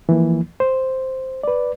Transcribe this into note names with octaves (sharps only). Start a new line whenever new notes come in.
E3 F3 A#3
C5
B4 D5